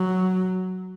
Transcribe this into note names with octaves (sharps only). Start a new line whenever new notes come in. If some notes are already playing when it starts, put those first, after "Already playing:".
Already playing: F#3